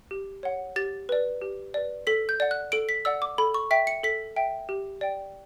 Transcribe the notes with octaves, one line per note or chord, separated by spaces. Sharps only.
G4
C#5 F#5
G4 A6
B4 D5
G4
B4 D5
A4 B6
G6
D5 F#5
F#6
A4 D7
B6
D5 F#5 E6
D6
A4 B5
C#6
E5 G5 B6
C#7
A4 B6
E5 G5
G4
D5 G5